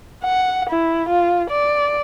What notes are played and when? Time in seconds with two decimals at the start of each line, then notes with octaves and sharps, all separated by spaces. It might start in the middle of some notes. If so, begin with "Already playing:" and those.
0.24 F#5
0.69 E4
1.09 F4
1.50 D5